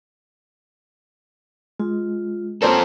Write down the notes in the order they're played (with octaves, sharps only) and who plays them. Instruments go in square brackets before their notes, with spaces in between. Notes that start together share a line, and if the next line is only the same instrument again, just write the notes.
[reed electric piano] G#3 [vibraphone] F4
[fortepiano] A#3 C4 C#4 [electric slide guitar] F4 A4 [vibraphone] C5 A#5